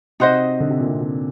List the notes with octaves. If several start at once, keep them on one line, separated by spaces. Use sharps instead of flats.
C3 D#4 F#4 C5 D#5
D3
C3
A#2
C3
C3